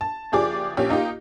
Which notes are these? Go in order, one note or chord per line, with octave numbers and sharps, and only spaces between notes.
A5
F#1 F3 G4 G#4 D5 D6
A#1 C#4 G4
A#3 D#4 F4 G4